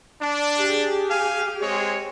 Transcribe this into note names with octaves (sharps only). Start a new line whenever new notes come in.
D4
G4 G#4
F5 G#5
G#3 C4 C#5